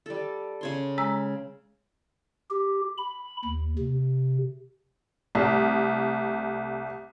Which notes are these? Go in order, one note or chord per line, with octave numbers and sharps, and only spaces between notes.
G3 A4
C#3 C#5 C6
G#3 A#5 E6
G4
B5
D#2
C3
C2 A3